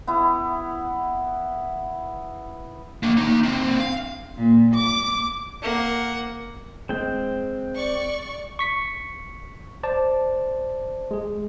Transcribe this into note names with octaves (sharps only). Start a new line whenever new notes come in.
B3 E4
A#3 D4
A#3 D#4
C4 D4
F5
A#2
D6
A#3 F#5
G#3 C4 G5
D5 C#6
C#6 B6 C#7
C5 D5 A5
G#3 G#4